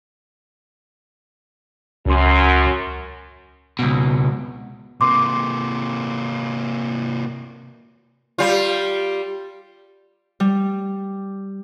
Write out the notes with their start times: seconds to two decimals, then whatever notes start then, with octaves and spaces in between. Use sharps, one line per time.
2.06 C#2 F#2 C6
3.79 C#2 B2
5.01 C3 A#3 C6 D6
8.38 G3 F4
10.40 G3